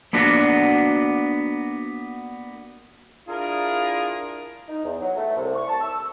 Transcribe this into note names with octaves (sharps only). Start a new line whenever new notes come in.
A#3 B3 D4 F#4
D4 E4 F4 G#4 A#4
D#4
E2
F#3
A3
C2
C#6
A5
E6